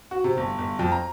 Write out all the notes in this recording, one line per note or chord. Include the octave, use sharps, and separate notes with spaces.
F#4
C3
G1
G1
F2
A#5